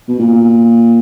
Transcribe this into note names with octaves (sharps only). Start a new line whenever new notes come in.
B2
A#2